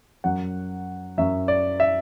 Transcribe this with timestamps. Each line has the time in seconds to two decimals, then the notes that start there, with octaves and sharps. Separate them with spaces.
0.24 F#2 F#3 F#5
1.18 F#2 F#3 E5
1.48 D5
1.80 E5